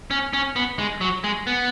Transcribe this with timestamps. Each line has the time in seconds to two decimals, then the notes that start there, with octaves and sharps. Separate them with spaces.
0.11 C#4
0.33 C#4
0.56 B3
0.79 G#3
1.01 F#3
1.24 G#3
1.47 B3